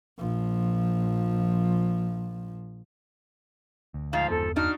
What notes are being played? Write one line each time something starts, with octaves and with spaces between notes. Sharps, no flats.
A#1 F3
D2
G#2 F3 F5
G1 E2 B3 A4
D4 D#4 F#4 F6